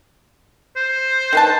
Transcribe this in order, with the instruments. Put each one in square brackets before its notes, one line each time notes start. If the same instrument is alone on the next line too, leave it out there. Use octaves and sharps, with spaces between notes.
[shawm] C5
[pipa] D#3 B4 A5